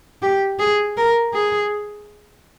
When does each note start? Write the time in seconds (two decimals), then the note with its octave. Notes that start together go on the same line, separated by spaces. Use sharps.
0.22 G4
0.59 G#4
0.97 A#4
1.34 G#4